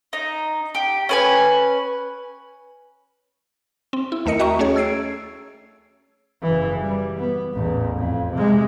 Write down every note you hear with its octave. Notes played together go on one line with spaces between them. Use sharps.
D#4
G4
C#4 B4 G#5
C4
E4
D#2 A3 A#4 D#5 C#7
F#4 D#5 E5 G5 A#5 C#6
A3 C#4 G#4 C#5
E6 G#6 C7 D7
F#1 E3
G3
B3
A1 E2
F2
C3 G#3